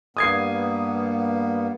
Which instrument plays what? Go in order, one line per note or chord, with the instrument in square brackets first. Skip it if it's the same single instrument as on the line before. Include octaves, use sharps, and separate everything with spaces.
[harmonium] G2 A#3 B3 [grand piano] D#6 G#6 C7